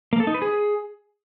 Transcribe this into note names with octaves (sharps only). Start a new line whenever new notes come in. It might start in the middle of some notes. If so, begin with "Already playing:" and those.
A#3
A4
D#4
B4
G#4